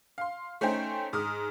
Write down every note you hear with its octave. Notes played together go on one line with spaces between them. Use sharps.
F5 C6
A3 C#4 D#4 C5 G5
G#2 D#6 F6